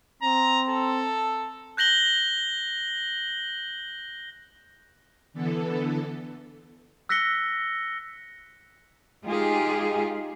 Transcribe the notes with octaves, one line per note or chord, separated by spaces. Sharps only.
C4 A#5
A4
F#6 G6 A#6 F#7 G7
D3 E3 B3 A4
E6 F#6 A#6 B6 C#7 G7
G#3 D#4 F4 G4 G#4